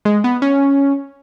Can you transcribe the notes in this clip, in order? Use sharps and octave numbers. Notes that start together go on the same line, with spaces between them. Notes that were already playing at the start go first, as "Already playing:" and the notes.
G#3
B3
C#4